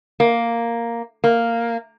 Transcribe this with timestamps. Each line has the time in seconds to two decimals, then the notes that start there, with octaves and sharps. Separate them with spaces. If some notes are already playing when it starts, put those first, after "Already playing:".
0.20 A#3
1.24 A#3